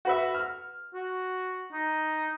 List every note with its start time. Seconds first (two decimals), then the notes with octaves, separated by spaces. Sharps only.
0.05 F#4 B4 E5
0.35 F6
0.94 F#4
1.72 D#4